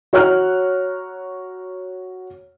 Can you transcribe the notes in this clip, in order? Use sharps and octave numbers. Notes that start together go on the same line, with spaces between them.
F#4 C#5 A#5 F6 F#6